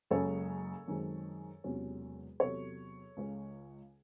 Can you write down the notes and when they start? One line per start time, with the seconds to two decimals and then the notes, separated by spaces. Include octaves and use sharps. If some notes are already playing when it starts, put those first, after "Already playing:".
0.11 F#1 F#2 C#3 G#3 C#4 A4 C#5
0.88 F#2 D#3 G#3 C4
1.64 E1 E2 C3 F#3 C#4
2.40 E2 C3 F#3 A4 C#5
3.17 C#2 C#3 G#3 C#4